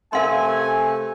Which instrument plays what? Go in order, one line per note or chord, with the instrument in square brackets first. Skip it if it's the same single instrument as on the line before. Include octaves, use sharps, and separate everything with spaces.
[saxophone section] C3 A3 [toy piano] A#4 F5 C6 [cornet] G#5